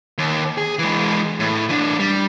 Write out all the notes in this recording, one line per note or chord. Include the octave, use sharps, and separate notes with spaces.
D#2
G#4
E3 G#3
A2
E3 D4
G3